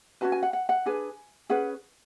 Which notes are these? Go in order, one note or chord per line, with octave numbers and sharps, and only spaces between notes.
C#4 F#4 B4 A5
G#5
F#5
F#5
F#5
D4 G#4 B4 G#5
C#4 G#4 B4 F#5